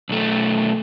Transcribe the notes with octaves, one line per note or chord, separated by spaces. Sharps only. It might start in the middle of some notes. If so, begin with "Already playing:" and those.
B1 A3